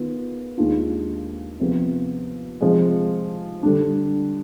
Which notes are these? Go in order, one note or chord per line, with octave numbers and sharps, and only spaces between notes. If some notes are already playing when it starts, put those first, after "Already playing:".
Already playing: D#3 B3 F4 G#4
D#2 D#3 G#3 D4 F4
C3 F3 B3
C3 F3 G#3
D3 G3 D4